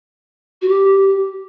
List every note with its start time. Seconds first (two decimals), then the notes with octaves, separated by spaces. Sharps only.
0.61 F#4
0.68 G4